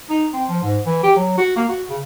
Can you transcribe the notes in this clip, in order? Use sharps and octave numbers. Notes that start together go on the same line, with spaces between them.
D#4
C4
F3
G#2
E3
G4
F#3
F#4
A#3
F#4
C#3